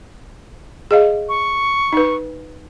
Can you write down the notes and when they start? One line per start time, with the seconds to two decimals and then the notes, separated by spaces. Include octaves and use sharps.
0.91 G#4 D#5 F5
1.29 C#6
1.93 D#4 B4